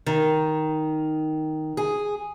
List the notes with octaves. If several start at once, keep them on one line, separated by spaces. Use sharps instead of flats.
D#3
G#4